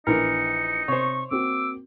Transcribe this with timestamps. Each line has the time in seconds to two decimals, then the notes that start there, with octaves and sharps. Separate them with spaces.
0.07 A#1 E3 D#4 A#4 C#7
0.88 C3 C5 C#5 C#6
1.31 A#3 C4 F#4 D6 E6